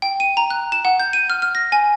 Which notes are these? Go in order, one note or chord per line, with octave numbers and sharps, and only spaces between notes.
G5
D#7
A#5
F#6
E7
F#5
G6
D#7
F6
F6
A#6
G#5